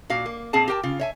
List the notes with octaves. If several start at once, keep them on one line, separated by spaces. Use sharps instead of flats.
A#2 F#4 F5
A#3
A#2 C4 G#4 F5 A5
G4 A#4 G5 A5
C#3 F4
C#5 E5 G#5